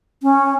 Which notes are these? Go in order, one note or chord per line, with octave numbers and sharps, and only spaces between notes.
C#4